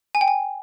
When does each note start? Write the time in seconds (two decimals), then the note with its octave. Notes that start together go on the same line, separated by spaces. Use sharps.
0.15 G#5
0.21 G5
0.28 G#5